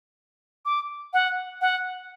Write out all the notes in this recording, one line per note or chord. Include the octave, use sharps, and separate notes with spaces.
D6
F#5
F#5